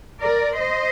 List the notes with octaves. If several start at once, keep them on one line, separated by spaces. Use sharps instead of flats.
A#4 D5
C5 D#5